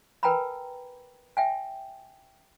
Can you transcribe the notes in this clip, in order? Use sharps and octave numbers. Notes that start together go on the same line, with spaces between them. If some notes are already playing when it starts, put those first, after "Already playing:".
A#4 B4 G5 G#5 A#5 B5
E5 G5 G#5